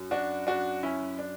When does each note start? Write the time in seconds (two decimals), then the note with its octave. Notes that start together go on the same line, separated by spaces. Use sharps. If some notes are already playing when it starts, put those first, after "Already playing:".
Already playing: F#2
0.11 D4 F#4
0.47 D4 F#4
0.83 C#4 E4
1.19 D4